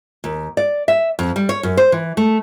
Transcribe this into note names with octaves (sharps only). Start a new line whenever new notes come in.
D#2
D5
E5
F2
G3
C#5
F#2
C5
E3
A3